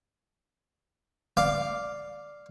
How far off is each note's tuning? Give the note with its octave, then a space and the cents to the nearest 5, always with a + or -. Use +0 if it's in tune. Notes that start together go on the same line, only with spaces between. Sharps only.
D5 +0 F5 +0 D6 +0